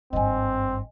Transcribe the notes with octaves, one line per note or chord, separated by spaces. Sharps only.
G#1 G2 C4 D#5 G#5